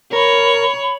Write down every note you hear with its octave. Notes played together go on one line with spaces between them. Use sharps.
A#4 C#5 B5